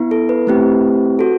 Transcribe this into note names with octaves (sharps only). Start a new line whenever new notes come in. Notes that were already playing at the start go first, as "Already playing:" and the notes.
Already playing: B3 E4
A4
B4
A3 C4 E4 G4
F#4 A4